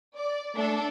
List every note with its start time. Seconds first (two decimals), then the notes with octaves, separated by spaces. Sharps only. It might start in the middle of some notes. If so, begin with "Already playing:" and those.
0.15 D5
0.55 A3 D4 A4